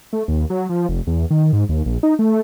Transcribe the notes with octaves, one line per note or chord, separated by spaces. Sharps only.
A3
D#2
F#3
F3
F1
E2
D#3
G#2
D#2
A#1
D#4
A3